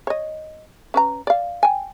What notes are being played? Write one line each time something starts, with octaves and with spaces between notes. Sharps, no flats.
C#5 D#5
C#4 B4 A#5
D5 F5
G5 G#5